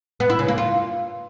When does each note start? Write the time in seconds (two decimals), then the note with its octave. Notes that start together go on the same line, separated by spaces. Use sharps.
0.20 B3
0.30 E4
0.39 C#3
0.48 A#3
0.58 F4